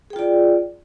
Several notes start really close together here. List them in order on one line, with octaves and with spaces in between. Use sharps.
G#4 G5 F4 D5